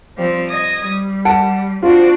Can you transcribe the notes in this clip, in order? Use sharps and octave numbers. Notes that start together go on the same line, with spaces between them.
F3 G3 C4
D#5 D#6 G#6
G3
F#5 A5 D7
C4 D4 F4 F#4